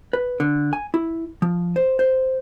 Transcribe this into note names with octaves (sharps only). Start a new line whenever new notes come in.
B4
D3
G#5
E4
F3
C5
C5